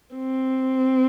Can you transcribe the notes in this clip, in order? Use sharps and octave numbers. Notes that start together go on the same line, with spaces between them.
C4